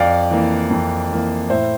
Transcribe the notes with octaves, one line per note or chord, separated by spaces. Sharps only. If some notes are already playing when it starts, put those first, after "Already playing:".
Already playing: F2 D5 F5
E3 A#3
F2
E3 A#3
A2 C5 E5